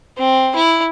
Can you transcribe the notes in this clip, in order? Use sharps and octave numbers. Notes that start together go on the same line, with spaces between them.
C4
E4